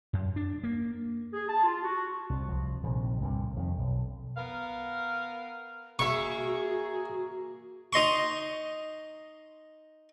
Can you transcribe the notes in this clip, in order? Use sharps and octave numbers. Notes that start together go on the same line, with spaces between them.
F#2
D4
A#3
G#4
A5
F4
F#4
C2
C2 F3
A#1 C3 D#3
C2 G2 A#2 D3
F2 D#3
B1
B3 A#4 F5
A#3 F#4 G#4 E5 C#6
D#4 D#5 C6 C#6